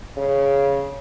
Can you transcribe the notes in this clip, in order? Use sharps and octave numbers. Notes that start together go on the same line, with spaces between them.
C#3